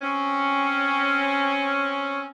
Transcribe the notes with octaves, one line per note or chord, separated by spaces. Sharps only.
C4 C#4